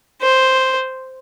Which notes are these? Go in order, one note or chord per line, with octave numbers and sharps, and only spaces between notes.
C5